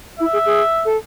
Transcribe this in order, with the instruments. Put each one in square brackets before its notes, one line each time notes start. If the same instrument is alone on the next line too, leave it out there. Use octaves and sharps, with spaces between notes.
[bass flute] E4 [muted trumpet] E5
[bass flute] G#4
G#4
A4